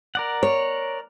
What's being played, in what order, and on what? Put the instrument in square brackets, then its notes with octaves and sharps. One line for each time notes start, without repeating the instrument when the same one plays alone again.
[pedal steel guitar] A#4 D5 F#5
[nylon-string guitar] C#5